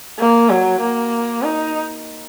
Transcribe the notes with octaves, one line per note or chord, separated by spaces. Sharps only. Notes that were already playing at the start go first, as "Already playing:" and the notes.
A#3
F#3
A#3
D#4